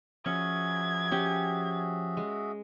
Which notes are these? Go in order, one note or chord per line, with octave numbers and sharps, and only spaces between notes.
F3 C#4 F#4 G#4 E5 G#6
C#4 G4
G#3